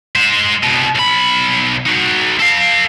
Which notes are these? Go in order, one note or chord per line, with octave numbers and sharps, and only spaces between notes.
G#3 C5
C2 B2
B1 B5
D#4 F#4
A4 F5